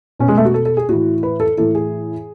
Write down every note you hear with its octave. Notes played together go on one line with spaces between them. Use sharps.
B2 C#4
G#3
A3
F#4
A4
A4
G#4
A2 E3 F#4
B4
A4
A2 E3 A4
G#4